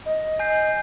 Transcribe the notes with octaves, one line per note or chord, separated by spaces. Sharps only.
D#5
G#5 G6 C7